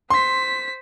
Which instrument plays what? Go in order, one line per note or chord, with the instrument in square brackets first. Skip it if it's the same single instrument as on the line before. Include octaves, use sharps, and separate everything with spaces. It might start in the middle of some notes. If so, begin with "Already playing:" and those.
[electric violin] C5 B6 [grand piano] C6